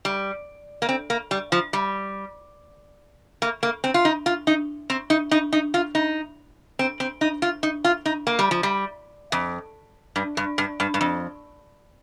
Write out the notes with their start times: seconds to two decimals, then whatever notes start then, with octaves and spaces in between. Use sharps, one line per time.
0.05 G3
0.82 A#3
0.89 C4
1.10 A#3
1.31 G3
1.52 F3
1.73 G3
3.42 A#3
3.63 A#3
3.84 C4
3.94 F4
4.05 D#4
4.26 F4
4.47 D#4
4.90 C4
5.10 D#4
5.31 D#4
5.53 D#4
5.74 F4
5.95 D#4
6.79 C4
7.00 C4
7.21 D#4
7.42 F4
7.63 D#4
7.84 F4
8.06 D#4
8.27 A#3
8.39 G3
8.51 F3
8.63 G3
9.32 F2
10.16 G2
10.37 G2
10.58 G2
10.80 G2
10.94 G2
11.01 F2